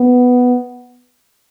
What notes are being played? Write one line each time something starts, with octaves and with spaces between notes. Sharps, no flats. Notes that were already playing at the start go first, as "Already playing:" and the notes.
Already playing: B3